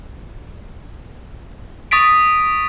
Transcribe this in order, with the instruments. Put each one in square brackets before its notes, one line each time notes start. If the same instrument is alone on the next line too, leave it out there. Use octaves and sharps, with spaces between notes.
[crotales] C#6 D#6 A6 B6 D7